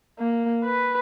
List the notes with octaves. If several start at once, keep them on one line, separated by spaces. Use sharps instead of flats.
A#3
B4